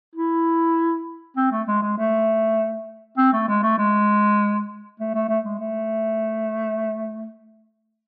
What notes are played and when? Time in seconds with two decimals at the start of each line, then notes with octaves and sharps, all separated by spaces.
0.16 E4
1.37 C4
1.52 A3
1.68 G#3
1.82 G#3
1.98 A3
3.18 C4
3.33 A3
3.48 G#3
3.63 A3
3.78 G#3
5.00 A3
5.15 A3
5.29 A3
5.45 G#3
5.60 A3